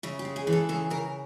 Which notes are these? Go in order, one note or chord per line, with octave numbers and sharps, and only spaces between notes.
C#3 E4
G4
G#3
G#4
E3
A4
C#3 A4
C#3 A#4